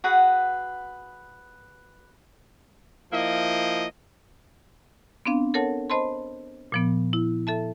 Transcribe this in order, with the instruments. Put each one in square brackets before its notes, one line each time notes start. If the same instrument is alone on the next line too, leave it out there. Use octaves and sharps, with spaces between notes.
[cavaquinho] F#4 G#4 B4 F#5
[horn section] F3 A#3 E4 D#5
[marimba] B3 C4 D4 F5
A4 A#4 C#5 F#5 A5
C5 D#5 A5 B5 C6
A#2 F3 B3
E4
A4 E5 A5